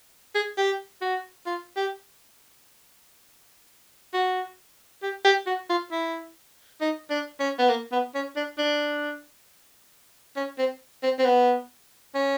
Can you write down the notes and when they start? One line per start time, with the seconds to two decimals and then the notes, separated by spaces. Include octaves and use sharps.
0.35 G#4
0.57 G4
1.02 F#4
1.46 F4
1.77 G4
4.14 F#4
5.03 G4
5.25 G4
5.47 F#4
5.70 F4
5.92 E4
6.81 D#4
7.10 D4
7.40 C#4
7.59 B3
7.69 A#3
7.92 B3
8.15 C#4
8.36 D4
8.58 D4
10.37 C#4
10.59 C4
11.03 C4
11.19 C4
11.25 B3
12.15 C#4